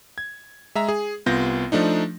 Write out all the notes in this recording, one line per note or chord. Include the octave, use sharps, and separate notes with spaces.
G#6
G#3 E5 A#5
G#4
C2 B3 F4 G6 A#6
F3 A3 D4 D#4